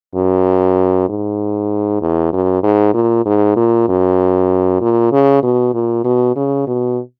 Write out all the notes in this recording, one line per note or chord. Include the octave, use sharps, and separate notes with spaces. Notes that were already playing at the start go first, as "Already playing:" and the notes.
F#2
G#2
E2
F#2
G#2
A#2
G#2
A#2
F#2
A#2
C#3
B2
A#2
B2
C#3
B2